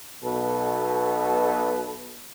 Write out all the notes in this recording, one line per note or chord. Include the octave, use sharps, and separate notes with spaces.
B1 B2 A4 B4